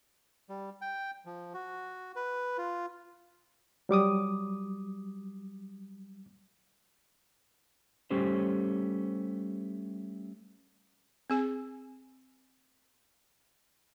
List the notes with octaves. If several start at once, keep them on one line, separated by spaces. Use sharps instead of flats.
G3
G5
F3
F#4
B4
F4
F#3 G3 D6 D#6
G3 A3 C#4 G4 C5
C4 G#4 G#5